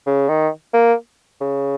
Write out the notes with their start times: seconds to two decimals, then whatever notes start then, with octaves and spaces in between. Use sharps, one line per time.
0.06 C#3
0.29 D#3
0.74 A#3
1.41 C#3